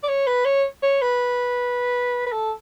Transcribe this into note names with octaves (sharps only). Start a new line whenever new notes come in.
D5
C#5
B4
C#5
C#5
B4
B4
A4